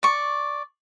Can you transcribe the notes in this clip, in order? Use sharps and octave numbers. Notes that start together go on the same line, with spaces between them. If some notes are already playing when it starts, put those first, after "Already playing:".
D5 C#6